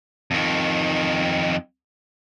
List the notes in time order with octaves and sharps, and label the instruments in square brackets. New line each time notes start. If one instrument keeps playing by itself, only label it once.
[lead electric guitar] F2 D#3